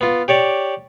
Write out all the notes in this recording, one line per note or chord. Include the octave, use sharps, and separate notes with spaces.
B3 F4
G4 C#5 D5